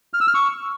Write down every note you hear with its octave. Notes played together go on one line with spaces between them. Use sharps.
F6
E6
F6
C#6